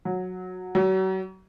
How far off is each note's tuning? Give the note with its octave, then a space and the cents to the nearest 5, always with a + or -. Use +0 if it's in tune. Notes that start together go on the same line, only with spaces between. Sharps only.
F#3 -15
F#3 +35